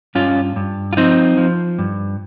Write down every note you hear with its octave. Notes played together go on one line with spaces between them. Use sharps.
G2 C#4 F4
G2
F4
F3 C4 D#4
F3
G2